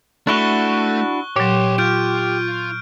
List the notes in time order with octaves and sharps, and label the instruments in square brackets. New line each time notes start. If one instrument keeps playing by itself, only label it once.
[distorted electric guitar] A3 [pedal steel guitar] D4 E4 F#4 [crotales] C#6 F#6 G7
[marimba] A#2 F#3 [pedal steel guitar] G4 [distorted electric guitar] C#5 C6
[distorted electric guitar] F4 [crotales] F6 G6 D7